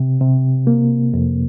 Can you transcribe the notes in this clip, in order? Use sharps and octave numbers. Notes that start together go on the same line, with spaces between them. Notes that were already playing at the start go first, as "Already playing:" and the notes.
Already playing: C3
C3
A#3
F2